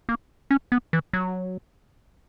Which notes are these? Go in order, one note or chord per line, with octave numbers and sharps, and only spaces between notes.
A#3
C#4
B3
E3
F#3